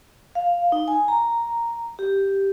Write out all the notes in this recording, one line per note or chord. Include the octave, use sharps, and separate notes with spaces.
F5
D#4
G#5
A#5
G4